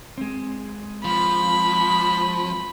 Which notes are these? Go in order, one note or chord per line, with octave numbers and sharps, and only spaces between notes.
G#3 C4
F3 B5